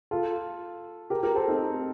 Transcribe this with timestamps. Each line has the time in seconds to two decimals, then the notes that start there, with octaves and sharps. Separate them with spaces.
0.11 F4 A4
1.10 G4 A#4
1.23 G4 A#4
1.35 A4 C5
1.48 C4 D#4